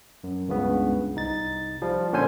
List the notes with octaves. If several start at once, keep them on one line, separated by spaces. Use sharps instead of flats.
F#2
C#2 G2 C#3 B3
C2 D#4 A6
F3 G3
A#2 D3 C#4 D4 C5 G#5